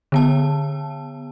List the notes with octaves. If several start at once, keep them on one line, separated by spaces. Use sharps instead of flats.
D3 B3 A5